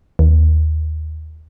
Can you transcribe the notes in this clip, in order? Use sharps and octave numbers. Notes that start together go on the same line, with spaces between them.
D#2